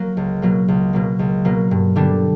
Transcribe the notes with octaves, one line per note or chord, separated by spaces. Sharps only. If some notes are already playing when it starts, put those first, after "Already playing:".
Already playing: F#3 A#3
C#2
B2 F#3 A#3
C#2
B2 F#3 A#3
C#2
B2 F#3 A#3
G2
D3 G3 B3 D4